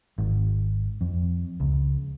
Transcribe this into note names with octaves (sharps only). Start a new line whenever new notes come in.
G#1
F2
C#2